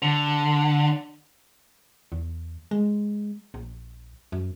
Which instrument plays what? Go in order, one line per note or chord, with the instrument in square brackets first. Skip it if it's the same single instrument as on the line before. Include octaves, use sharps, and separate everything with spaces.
[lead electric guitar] D3
[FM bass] E2
G#3
A#1
F#2